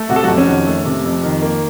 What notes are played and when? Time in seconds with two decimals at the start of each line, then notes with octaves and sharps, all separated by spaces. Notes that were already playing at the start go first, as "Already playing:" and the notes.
Already playing: A3
0.09 C3 F#4
0.16 A4
0.23 F#3 F#4
0.28 F2
0.38 C#4
0.47 D#3
0.67 A3
0.85 C3
1.05 F2
1.24 D#3
1.42 A#3